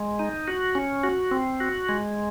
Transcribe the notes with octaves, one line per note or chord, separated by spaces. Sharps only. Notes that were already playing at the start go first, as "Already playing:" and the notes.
Already playing: G#3
D#4
F#4
C#4
F#4
C4
F#4
G#3